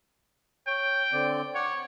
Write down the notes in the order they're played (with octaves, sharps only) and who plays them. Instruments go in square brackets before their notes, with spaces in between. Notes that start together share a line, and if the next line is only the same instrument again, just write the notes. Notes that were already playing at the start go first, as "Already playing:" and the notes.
[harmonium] C#5 [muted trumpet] G5
[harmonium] D3 C4 D5
[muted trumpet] C#5 [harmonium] D5 F#5